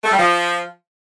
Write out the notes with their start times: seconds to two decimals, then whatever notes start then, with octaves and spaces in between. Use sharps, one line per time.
0.04 A3
0.11 G3
0.18 F3